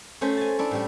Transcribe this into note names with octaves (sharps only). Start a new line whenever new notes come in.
A3 C#4 C5
G#5 A5
D4 E4 C#5
A2 G3 E4